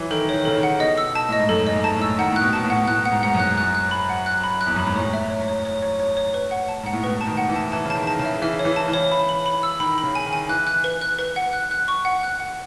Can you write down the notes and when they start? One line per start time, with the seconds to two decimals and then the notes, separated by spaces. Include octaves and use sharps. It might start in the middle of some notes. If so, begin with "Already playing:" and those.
Already playing: E3 F#3
0.11 D#3 A4
0.29 D#3 C#5
0.45 C#3 A4
0.57 D#3
0.63 F#5
0.80 B2 D#5
0.98 E6
1.15 A5
1.29 A2 D#5
1.39 G#2
1.49 F#2 A4
1.67 D#5
1.73 G#2
1.84 A5
1.96 A2
2.02 E6
2.19 D#3 F#5
2.32 A2 F#6
2.41 B2
2.53 B2 A5
2.64 A2
2.70 F#5
2.87 A2 F#6
3.05 F#5
3.12 G#2
3.23 G#2 F#5
3.35 F#2 F#6
3.58 F#6
3.75 F#6
3.91 B5
4.09 F#5
4.26 F#6
4.43 B5
4.61 F#6
4.67 E2
4.76 F#2 B5
4.86 G#2
4.95 A2 C#5
5.13 E5
5.30 C#5
5.48 C#5
5.65 C#5
5.82 C#5
6.00 C#5
6.17 C#5
6.34 B4
6.51 F#5
6.69 A5
6.83 G#2 F#5
6.93 A2
7.03 B2 B4
7.21 A5
7.27 D#3
7.37 F#5
7.49 E3
7.56 A5
7.72 E3 A5
7.85 C#3
7.90 A5
7.95 D#3
8.07 A5
8.19 C#3
8.25 E5
8.42 E3 E5
8.59 C#5
8.65 E3
8.76 A5
8.88 E3
8.93 C#5
9.12 B5
9.29 B5
9.46 B5
9.63 E6
9.80 D#3 B5
9.98 B5
10.03 C#3
10.15 G#5
10.26 D#3
10.33 G#5
10.49 E3 F#6
10.67 F#6
10.84 B4
11.01 F#6
11.19 B4
11.36 F#5
11.53 F#6
11.71 F#6
11.88 C#6
12.05 F#5
12.23 F#6
12.40 F#5